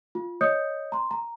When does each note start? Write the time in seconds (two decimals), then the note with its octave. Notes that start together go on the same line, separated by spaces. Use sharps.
0.15 F4
0.41 C#5 D#5 D#6 G6 C#7
0.92 A#5 C6
1.11 A#5